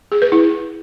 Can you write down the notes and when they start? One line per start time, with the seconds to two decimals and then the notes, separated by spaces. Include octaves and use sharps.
0.12 G#4
0.22 B4
0.32 E4